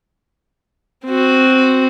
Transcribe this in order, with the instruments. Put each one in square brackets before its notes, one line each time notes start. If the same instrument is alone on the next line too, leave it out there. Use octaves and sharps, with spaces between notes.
[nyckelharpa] C4 F#4